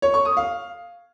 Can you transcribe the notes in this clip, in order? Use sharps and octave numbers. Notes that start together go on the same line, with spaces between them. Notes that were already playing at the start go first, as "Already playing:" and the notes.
C#5
C#6
D#6
F5